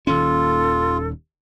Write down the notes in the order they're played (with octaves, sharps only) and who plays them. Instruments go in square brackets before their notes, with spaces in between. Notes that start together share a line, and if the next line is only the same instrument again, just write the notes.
[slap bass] D#1 D#2 C#4 [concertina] F4 [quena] A4